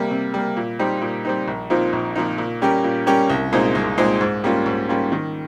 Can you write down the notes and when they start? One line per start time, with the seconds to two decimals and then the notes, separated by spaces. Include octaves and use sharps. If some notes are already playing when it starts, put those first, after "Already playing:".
Already playing: C3 G3 A#3
0.11 C3
0.34 G3 A#3
0.57 A#2
0.79 G3 C4 D#4
1.01 A#2
1.25 G3 C4 D#4
1.48 A#1
1.70 A#2 F3 C4 D#4
1.93 A#1
2.16 A#2 F3 C4 D#4
2.38 A#2
2.62 G3 C#4 G4 A#4
2.84 A#2
3.07 G3 C#4 G4 A#4
3.30 C2
3.52 A#2 G#3 C4 D#4
3.75 C2
3.98 A#2 G#3 C4 D#4
4.21 G#2
4.44 G3 A#3 C#4 F4
4.66 G#2
4.89 G3 A#3 C#4 F4
5.12 D#3